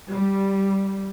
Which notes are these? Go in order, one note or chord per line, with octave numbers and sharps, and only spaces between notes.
G3